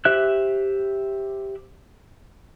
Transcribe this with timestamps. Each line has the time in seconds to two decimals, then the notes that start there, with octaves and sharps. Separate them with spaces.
0.05 G4 C5 E5 F#6